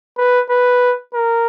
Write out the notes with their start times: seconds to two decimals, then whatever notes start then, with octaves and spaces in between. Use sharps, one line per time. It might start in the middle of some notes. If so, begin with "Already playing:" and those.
0.18 B4
0.50 B4
1.14 A#4